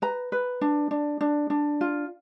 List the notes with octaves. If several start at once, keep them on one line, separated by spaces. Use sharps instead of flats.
B4 A#5
B4
D4
D4
D4
D4
F4